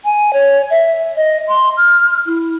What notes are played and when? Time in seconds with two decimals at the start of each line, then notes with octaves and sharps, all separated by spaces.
0.04 G#5
0.33 C#5
0.70 E5
1.16 D#5
1.48 C6
1.77 F6
2.26 E4